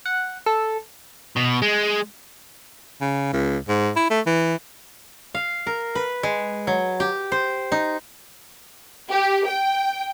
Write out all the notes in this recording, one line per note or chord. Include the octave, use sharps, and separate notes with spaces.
F#5
A4
B2
G#3
C#3
C#2
G#2
E4
A3
E3
F5
A#4
B4
G#3
F#3
G4
C5
D#4
G4
G5